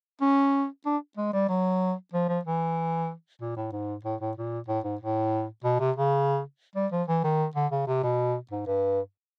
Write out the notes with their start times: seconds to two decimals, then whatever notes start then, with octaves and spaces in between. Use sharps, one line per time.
0.21 C#4
0.86 D4
1.17 G#3
1.33 G3
1.49 F#3
2.13 F3
2.29 F3
2.45 E3
3.41 A#2
3.57 A2
3.72 G#2
4.05 A2
4.21 A2
4.37 A#2
4.68 A2
4.84 G#2
5.00 A2
5.64 B2
5.80 C3
5.96 C#3
6.76 G3
6.92 F3
7.08 E3
7.24 D#3
7.55 D3
7.72 C#3
7.87 C3
8.03 B2
8.51 G#2
8.67 G2